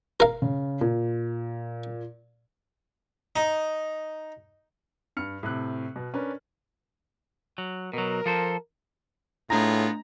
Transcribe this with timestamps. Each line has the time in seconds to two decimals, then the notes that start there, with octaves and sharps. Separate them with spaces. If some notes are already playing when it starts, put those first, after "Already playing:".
0.20 A#4 F5
0.42 C#3
0.81 A#2
3.36 D#4
5.17 G2 F6 C#7
5.43 A2 C3 F#6
5.96 B2
6.14 C#4 D4 A#4 B4
7.58 F#3
7.93 B2 F#3 A#4
8.26 F3 A4 C5
9.50 A2 A3 B3 D4 F4 G#4 A#5 A#6